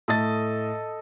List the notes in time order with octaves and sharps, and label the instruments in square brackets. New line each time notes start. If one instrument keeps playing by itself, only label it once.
[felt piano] A2 A6 [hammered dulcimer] A4 D#5